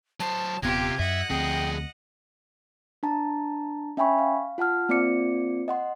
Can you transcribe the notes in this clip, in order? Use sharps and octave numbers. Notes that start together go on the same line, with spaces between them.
F#3 C5 A5
D#1 C3 B3 F4 G4 G#6
F#2 D#5 E5 F#5
D2 F3 C4 G#4 G5
D4 A5 A#5
C#4 E5 G5 G#5 B5 C#6
F5
F4 F#5 A5 F6
A#3 C4 F4 D5 D6 C#7
D#5 F#5 C6